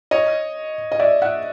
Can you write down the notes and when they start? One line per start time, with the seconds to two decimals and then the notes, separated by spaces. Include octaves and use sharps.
0.11 C#5 D#5
0.92 D#5
0.99 D5 E5
1.22 E5 F#5